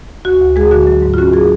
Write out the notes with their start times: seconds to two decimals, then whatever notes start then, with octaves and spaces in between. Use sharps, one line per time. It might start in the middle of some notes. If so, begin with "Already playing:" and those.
0.25 D2 F#4
0.41 D2
0.56 G#3 G#4
0.71 D3 F#4
0.87 F#3
1.02 G#2
1.14 F4
1.18 C#4 F#4
1.33 F#3 G#4